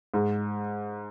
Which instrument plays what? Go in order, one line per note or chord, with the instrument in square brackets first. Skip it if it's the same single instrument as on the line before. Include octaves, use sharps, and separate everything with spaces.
[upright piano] G#2